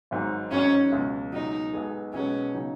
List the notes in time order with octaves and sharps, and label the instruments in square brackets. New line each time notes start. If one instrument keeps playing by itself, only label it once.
[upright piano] G#1 G#2 F#3 D#4
[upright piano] G#1 G#2 F#3 D#4 [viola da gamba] C#4
[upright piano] C#2 B2 F#3
[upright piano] C#2 B2 F#3 [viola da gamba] D#4
[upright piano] B1 B2 G#3 B3 G#4
[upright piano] B1 B2 G#3 B3 G#4 [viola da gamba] C#4
[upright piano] C#3 F#3 D#4